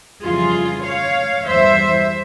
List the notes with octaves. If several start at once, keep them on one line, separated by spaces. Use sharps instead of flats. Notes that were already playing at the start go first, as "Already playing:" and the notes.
F2 C#3 E3 G3 F4 G#4
C#5 F5
E2 E3 G3 C5 E5